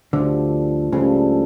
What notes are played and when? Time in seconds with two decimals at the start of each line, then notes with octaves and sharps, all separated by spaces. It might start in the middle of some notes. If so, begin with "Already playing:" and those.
0.13 D2 G2 D3 F3 A3 E4
0.92 C#2 G2 C#3 F3 A3 E4